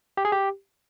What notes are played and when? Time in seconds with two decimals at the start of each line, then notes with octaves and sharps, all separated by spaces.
0.17 G4
0.25 G#4
0.32 G4